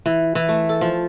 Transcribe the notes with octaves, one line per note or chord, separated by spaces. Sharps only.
E3
E3
A3
A4
F3